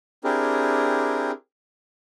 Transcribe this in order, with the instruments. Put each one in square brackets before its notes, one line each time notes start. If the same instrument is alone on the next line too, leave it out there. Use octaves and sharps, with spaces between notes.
[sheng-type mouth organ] C4 D4 E4 G4 G#4 A#4